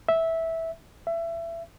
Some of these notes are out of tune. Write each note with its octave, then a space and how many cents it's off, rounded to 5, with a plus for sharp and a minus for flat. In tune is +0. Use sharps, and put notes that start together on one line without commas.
E5 -10
E5 +25